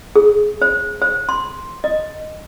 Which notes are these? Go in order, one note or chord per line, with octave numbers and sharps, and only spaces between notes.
G#4
C5
C5
C6
D#5